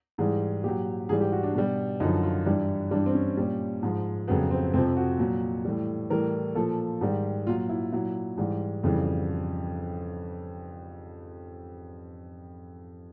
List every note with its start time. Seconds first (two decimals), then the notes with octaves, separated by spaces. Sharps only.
0.18 G#2 E3 G3 G#4
0.64 A#2 F#3 G4
1.09 G#2 E3 G3 G#4
1.21 G4
1.32 F#4
1.43 D4
1.54 B2 G3
2.00 F#2 D3 F3 D#4
2.23 F4
2.46 G2 E3 G3 E4
2.91 G2 E3 G3 D4
3.06 C4
3.15 C#4
3.37 A#2 G3
3.83 G#2 F3
4.27 F2 C#3 F#3 B3
4.51 C4
4.74 F2 C3 F3 C4
4.97 F#4
5.19 A#2 F#3
5.65 A2 E3 G3
6.10 A2 E3 G3 A#4
6.55 A#2 F3 A4
7.01 G#2 D#3 G3
7.47 A#2 F#3 F4
7.69 E4
7.93 A#2 F#3 E4
8.38 G#2 E3 G3
8.84 F2 C#3 E3 G3